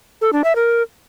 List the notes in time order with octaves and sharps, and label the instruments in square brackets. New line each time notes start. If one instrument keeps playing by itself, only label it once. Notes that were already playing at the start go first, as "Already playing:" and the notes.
[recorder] A4
D4
E5
A#4